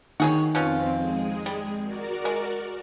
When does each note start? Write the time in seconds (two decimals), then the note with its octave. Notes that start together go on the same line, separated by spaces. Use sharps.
0.20 D#3 F#4 G#4 C#5
0.55 F2 B2 C4 C#4 F4
0.97 G#3 G#4
1.46 G3
1.83 F#4 A#4 D5
2.25 G#3